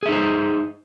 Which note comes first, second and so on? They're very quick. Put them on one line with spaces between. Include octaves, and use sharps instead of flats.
G#4 E5 D#4 C5